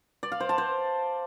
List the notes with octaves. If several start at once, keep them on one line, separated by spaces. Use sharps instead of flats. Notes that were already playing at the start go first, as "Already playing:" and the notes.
D5
F5
C5
A5
C5